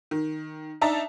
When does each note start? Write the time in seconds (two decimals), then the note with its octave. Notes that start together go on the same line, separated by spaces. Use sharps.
0.11 D#3
0.81 D4 D#4 E5 A5 A#5